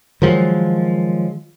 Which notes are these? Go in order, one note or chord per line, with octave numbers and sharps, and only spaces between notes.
D#3 F3 F#3 G#3